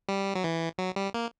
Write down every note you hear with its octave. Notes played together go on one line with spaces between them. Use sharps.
G3
F#3
E3
F#3
G3
A#3